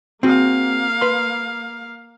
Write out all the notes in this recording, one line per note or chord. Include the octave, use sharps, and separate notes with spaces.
A#3 C4 F#4 G#4 F5
B4 C6